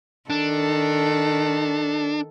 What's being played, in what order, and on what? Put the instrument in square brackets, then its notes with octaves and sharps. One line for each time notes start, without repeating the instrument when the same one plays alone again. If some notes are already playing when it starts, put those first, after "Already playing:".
[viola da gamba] D#3 A4 [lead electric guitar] D4